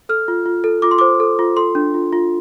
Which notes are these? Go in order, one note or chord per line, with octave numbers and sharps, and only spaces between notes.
A4 F6
F4
F4
A4
F4 D6
C6
C5 D6
A4
F4
A4 C6
D4
F4
F4